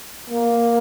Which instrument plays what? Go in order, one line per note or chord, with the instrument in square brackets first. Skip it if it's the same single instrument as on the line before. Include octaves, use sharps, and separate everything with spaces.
[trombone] A#3